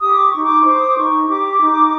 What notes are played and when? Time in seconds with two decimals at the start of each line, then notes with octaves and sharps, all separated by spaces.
0.01 G4 D#6
0.15 D6
0.30 D#4 C#6
0.43 D6
0.61 C#6
0.65 C5 D6
0.77 D#6
0.87 D6
0.97 D#4 C#6
1.28 G4 D6
1.60 D#4